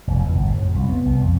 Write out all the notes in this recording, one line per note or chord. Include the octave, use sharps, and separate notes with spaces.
F1
E2
G1
A2
F2
C2
B3
C2
F2